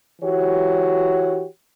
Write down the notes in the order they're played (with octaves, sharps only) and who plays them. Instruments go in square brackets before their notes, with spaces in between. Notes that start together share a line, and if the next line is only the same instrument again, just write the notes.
[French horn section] E3 F#4 G4 C#5